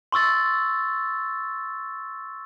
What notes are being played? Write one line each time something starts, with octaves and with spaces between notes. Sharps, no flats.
C6 C#6 E6 A6